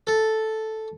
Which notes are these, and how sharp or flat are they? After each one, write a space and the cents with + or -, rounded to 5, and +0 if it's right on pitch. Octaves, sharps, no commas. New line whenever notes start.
A4 -5